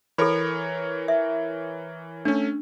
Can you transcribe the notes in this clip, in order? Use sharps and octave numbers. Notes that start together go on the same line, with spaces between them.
E3 A4 A#4 C#5 B5
E5
A3 C#4 D4